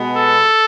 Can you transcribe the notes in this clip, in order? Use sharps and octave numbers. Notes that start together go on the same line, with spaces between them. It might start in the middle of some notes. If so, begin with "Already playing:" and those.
Already playing: B2 G#3 B3
A4